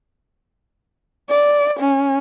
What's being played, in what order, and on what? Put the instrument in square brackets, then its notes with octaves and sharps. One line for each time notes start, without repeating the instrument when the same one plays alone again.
[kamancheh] D5
C#4